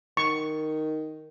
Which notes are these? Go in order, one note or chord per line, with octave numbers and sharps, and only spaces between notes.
D#3 C#6